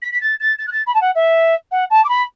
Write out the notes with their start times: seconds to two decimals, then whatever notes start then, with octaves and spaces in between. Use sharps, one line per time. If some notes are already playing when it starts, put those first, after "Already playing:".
0.02 B6
0.12 B6
0.21 A6
0.40 A6
0.59 A6
0.67 F#6
0.72 A6
0.87 B5
0.94 A5
1.01 F#5
1.15 E5
1.71 F#5
1.90 A5
2.04 D6
2.09 B5